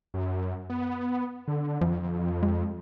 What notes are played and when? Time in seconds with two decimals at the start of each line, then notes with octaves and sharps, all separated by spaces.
0.14 F#2
0.70 B3
1.48 D3
1.81 F2 F3
2.43 G#3